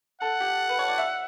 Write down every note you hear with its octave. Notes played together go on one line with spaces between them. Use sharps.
A4 F#5
G4
B4
C#5
D5
E5